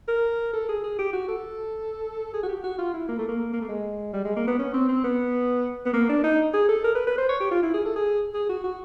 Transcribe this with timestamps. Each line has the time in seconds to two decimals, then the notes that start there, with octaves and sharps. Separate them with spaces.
0.08 A#4
0.53 A4
0.68 G#4
0.83 G#4
0.98 G4
1.13 F#4
1.28 A4
2.34 G#4
2.43 F#4
2.48 G4
2.63 F#4
2.78 F4
2.94 E4
3.08 A#3
3.18 A3
3.28 A#3
3.53 A#3
3.61 A3
3.69 G#3
4.13 G3
4.25 G#3
4.36 A#3
4.47 B3
4.59 C#4
4.73 C4
4.88 C4
5.04 B3
5.85 B3
5.93 A#3
6.09 D4
6.23 D#4
6.53 G#4
6.69 A4
6.84 A#4
6.95 B4
7.06 B4
7.18 C5
7.29 C#5
7.40 G4
7.51 F4
7.63 E4
7.74 G#4
7.85 A4
7.96 G#4
8.34 G#4
8.49 F#4
8.64 F#4